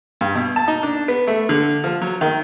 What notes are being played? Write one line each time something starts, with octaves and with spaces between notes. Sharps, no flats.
G2
B2
A5
D#4
D4
B3
A3
D3
F3
F#3
D#3